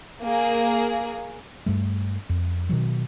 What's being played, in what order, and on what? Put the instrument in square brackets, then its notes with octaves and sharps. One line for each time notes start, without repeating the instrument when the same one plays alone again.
[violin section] A#3 G#4
[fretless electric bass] G2 G3 A3
F2
B2 D#3 F#3